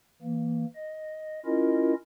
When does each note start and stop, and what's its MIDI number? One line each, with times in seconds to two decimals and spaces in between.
0.22 0.65 52
0.22 0.65 58
0.76 1.40 75
1.45 1.94 61
1.45 1.94 64
1.45 1.94 65
1.45 1.94 70
1.45 1.94 75